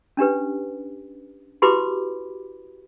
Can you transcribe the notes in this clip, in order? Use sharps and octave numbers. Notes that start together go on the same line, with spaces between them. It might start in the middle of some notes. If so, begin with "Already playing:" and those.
C#4 D4 G4 B4
E4 F#4 G4 B4 B5 D6